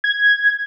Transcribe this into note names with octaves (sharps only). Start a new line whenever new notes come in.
G#6